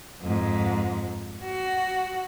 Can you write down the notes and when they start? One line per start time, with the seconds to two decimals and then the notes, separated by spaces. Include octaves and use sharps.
0.21 F2 G#2
1.43 F#4